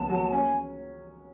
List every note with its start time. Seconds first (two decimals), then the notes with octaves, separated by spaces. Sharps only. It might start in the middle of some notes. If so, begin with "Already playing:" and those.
Already playing: C#2 B3 A5
0.09 F#3
0.32 C#4 G#5